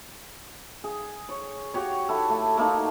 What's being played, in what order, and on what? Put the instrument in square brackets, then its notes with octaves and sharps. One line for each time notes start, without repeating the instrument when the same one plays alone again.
[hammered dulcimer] G#4
C#5
F#4 G4 C#5
E4 A4
A3
A3 A#3 D#4